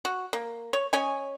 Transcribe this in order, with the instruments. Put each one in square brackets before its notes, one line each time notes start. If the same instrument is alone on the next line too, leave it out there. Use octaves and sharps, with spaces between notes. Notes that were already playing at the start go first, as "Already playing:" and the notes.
[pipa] F#4
A#3
C#5
C#4 C#5 D#5 G#5